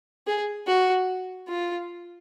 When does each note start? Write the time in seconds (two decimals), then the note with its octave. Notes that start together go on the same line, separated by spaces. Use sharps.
0.27 G#4
0.67 F#4
1.49 F4